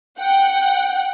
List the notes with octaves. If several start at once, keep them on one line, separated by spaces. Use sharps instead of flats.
F#5 G5